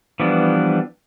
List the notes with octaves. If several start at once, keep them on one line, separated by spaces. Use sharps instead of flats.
E3 F3 G3 B3 D4